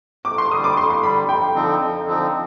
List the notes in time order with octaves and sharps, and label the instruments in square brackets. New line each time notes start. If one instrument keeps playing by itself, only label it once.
[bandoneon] F2 [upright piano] D6
[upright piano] C6
[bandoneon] D3 G3 [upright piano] D#6
[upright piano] D6
[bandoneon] F2 [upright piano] C6
[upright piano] C6
[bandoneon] D3 G3 [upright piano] B5
[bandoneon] F2 [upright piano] G5
[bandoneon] D3 F3 C4 D#4
F2
D3 F3 C4 D#4